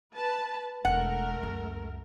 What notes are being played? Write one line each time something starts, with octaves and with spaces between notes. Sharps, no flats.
B4 A5
E1 G#3 A3 A#4 F#5
C#2 F#2